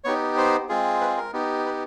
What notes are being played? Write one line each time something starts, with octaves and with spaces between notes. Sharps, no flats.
B3 D#4 G4 C#5
C5
G#3 C4 F4 G#4
B4
A#4
B3 D#4 G4
B4